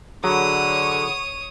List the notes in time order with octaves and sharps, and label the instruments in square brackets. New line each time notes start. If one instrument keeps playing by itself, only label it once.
[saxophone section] D3 [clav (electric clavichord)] F#3 [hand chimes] G#4 F#5 B5 [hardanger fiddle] C#5 D#6